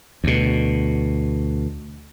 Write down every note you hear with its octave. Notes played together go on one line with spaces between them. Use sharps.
D2 B2